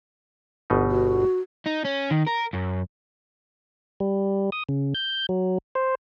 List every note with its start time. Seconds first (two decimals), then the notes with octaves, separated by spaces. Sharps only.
0.70 G1 B2 D#4
0.91 F#4
1.66 D#4
1.85 C#4
2.11 D#3
2.27 A#4
2.54 F#2
4.00 G3
4.52 D#6
4.69 C#3
4.95 G6
5.29 F#3
5.75 C5